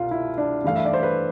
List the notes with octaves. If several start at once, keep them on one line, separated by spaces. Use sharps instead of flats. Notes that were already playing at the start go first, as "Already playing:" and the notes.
Already playing: C2 B2 F4
E4
D4
G2 E3 A3 F5
E5
D5
C5
B4